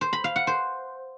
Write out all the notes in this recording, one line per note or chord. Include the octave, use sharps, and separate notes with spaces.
C5
B5
F5
F#5
C5